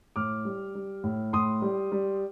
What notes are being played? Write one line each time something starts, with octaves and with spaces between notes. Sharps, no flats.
A2 D6 F6
G3
G3
A2
A2 C6 D#6
G3
G3